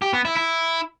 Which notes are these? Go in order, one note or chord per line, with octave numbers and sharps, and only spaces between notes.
G4
B3
E4
E4